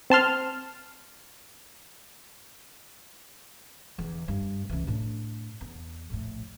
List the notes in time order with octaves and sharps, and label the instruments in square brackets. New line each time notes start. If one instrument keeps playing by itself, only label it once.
[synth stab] C4 A5 C6 F6
[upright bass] E2 D3
G2
C#2 E3
A2 D4
E2
A#1 A2